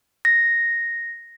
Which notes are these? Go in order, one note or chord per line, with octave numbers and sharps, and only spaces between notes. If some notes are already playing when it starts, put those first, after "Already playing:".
A#6